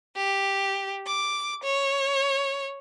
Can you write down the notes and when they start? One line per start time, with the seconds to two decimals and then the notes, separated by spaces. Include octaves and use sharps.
0.17 G4
1.06 D6
1.64 C#5